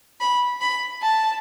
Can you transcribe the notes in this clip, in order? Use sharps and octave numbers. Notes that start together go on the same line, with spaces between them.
B5
B5
A5